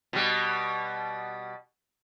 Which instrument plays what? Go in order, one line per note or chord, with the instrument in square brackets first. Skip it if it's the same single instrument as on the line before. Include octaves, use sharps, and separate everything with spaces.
[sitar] B2 G3